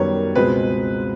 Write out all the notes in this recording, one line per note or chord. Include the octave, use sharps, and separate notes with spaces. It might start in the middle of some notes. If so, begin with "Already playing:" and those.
Already playing: F#2 D#3 G3 B3 C#5
C#2 B2 G#3 C4 B4